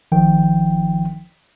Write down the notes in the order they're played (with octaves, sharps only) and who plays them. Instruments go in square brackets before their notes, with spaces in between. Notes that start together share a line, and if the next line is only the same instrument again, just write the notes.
[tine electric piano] G#1 D#3 F3 G5